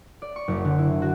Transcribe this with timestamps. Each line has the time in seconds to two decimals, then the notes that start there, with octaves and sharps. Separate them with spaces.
0.22 D5
0.36 C#6
0.48 F#1
0.64 D3
0.78 E4
1.02 F#4